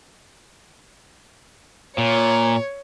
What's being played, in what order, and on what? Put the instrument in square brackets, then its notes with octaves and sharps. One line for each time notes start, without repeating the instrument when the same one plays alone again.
[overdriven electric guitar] A#2 [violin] C#5